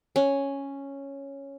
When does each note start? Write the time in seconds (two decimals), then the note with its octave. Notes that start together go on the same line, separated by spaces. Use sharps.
0.16 C#4